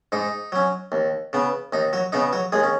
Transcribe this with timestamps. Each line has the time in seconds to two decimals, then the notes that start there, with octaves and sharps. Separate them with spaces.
0.12 G#2 D#4
0.52 F#3 C#4
0.92 D#2
1.33 C#3 B3
1.73 D#2 D#4
1.93 F#3 F#4
2.12 C#3 B3 D#4
2.33 F#3 F#4
2.52 D#2 G#3 G#4
2.63 C#4